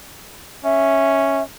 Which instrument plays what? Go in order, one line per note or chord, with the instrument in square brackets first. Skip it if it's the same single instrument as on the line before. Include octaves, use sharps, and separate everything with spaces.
[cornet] C#4 [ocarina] E5